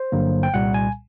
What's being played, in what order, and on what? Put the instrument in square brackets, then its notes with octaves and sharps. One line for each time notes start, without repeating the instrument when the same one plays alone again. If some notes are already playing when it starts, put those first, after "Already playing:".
Already playing: [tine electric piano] C5
G1 G2 D3 F#3 A#3
G5
C2 A#2 G3 F#5
G#5